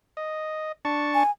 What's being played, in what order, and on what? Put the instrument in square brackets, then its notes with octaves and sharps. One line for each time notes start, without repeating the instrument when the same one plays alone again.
[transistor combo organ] D#5
D4 A5 C#6
[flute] G#5